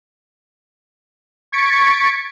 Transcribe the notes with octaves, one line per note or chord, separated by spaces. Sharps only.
C#6 G#6 A6 B6 C#7 D7